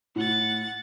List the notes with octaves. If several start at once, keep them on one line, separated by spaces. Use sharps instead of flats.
A2 F#5 A6